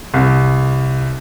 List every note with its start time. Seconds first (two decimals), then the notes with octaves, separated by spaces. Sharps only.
0.14 C2